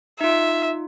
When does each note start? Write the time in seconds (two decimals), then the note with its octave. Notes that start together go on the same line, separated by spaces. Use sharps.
0.21 D#4 F4 E5